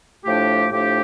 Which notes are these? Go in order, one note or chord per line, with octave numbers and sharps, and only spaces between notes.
A2 F3 A3 D4 G4
A2 F3 A3 D4 G4